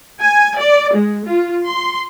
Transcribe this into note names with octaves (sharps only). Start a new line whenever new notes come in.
G#5
D5
G#3
F4
C6